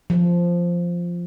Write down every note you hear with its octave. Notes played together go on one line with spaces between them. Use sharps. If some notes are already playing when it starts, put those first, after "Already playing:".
F3